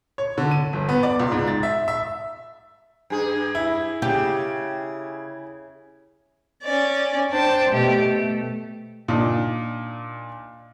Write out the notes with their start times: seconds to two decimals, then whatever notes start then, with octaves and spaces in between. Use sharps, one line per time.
0.18 C#5
0.38 D3
0.51 D#7
0.73 G1
0.89 B3
1.03 D5
1.20 C#2
1.32 G#2
1.48 A6
1.63 E5
1.88 E5
3.10 G2 G#4
3.55 E4
4.02 C#3 G4
6.64 C#4 D5
7.32 D4 C5 G5 A5
7.71 B2 A3 G4
8.05 A3
9.08 A#2 D4 D#4